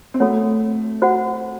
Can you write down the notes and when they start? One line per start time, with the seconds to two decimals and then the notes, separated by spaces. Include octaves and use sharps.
0.14 C4
0.20 A3 F#4 A4 C#5 F#5
1.02 F#4 C5 F#5